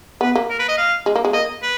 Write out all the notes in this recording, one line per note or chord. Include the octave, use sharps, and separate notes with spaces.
B3 B4
A#3
A#4
B4
D#5
F5
G#3
A#3
G#3
A#3 D#5
B4